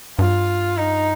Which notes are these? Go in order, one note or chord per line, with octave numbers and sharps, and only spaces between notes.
G2 F4
D#4